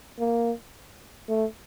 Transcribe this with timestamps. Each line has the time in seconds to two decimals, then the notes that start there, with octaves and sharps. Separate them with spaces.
0.19 A#3
1.29 A3